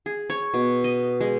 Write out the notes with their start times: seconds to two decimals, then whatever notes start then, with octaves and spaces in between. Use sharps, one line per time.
0.06 G#4
0.30 C#5
0.54 B2
0.84 D#5
1.21 G#3